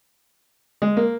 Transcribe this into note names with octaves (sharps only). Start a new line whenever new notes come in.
G#3
A#3